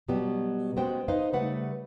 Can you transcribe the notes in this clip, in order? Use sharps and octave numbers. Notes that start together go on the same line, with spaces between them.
B2 F#3 G3 B3 G4
G#3 B3 C#4 F#4 C5 G5
D#4 B4 C5 D#5 F5
C#3 G3 A3 B4 F#5